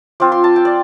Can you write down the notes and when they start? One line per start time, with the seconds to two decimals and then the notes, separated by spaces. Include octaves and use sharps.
0.20 F3 C4 F4 D6
0.32 C6
0.44 A5
0.56 G5
0.65 D5